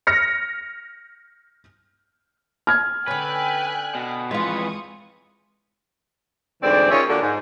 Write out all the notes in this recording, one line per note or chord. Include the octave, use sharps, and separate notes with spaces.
F6 A#6 C#7
F6 G#6
D3 C#4 B4 G5 G#5 F#6
B2
F2 E3 G#3 F4 B4 C#6 D#6
D2 G#2 E3 C4 D5
D#3 C#4 F4 G#4 C#5 E5
A#2 D3 A#3 D4 F#4 A4
G#2